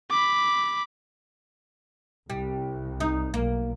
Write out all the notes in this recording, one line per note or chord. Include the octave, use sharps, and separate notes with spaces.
B5 D6
C2 G3
D#4
B1 A#3